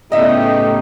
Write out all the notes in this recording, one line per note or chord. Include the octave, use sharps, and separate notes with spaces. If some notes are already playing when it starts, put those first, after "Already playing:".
A2 C#3 A3 B3 D#4 G4 D#5 E5